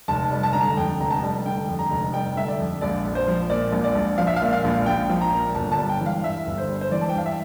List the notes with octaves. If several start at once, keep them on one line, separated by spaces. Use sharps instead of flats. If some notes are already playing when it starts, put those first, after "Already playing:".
F1 A5
G3
A5
D3 A#5
A5
F2 G5
F1 A#5
A5
G3
D3 G5
F2
A#5
F1
G3 G5
D3 E5
D5
F2
A#1 D5
A#1
C5
F3
A#2 D5
A#1
D5
A#1
F3 F5
E5
F5
A#2
F5
A#1
A#1 G5
F3
A#5
A#2
G1 A5
A5
G3
G5
E3
F5
G2 E5
G1
C5
G3
C5
E3 D5
A5
G5
G2 F5
E5